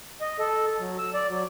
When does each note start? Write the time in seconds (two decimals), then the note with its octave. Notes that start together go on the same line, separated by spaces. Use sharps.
0.21 D#5
0.39 A4
0.80 F#3
0.99 E6
1.14 D5
1.30 F#3